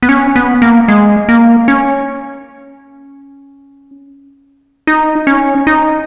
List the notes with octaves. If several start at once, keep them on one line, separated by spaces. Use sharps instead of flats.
B3
C#4
B3
A#3
G#3
A#3
C#4
D#4
C#4
D#4